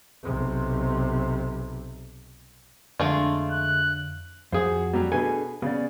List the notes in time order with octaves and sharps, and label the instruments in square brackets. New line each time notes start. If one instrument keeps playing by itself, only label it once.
[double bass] B1 C3
[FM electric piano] F2 D3 D4 [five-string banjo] G#3 A3 F4
[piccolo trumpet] F#6
[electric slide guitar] F2 F#4 [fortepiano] G#4 C5
[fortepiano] F#3 G3
[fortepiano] B2 B4 G#5 [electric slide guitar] D4 G#4 A4
[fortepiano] C#3 [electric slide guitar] B3 D5